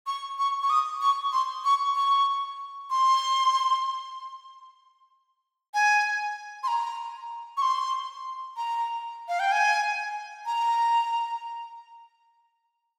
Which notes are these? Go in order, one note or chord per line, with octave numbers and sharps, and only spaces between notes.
C#6
C#6
C#6
D#6
C#6
C6
C#6
C#6
C6
G#5
C6
A#5
C#6
C6
A#5
F5
G5
G#5
A#5